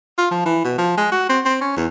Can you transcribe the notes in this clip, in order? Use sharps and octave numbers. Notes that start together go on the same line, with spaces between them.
F4
F3
E3
B2
F3
G#3
F#4
C4
C4
C#4
E2